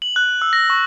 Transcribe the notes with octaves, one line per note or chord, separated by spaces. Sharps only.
F#7
F#6
E6
A#6
C#6